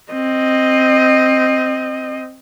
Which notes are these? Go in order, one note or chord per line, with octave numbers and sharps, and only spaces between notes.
C4 D#5